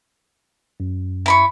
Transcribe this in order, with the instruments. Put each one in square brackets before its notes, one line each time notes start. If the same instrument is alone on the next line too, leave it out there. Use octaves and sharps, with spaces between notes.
[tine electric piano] F#2
[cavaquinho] E4 B5 C#6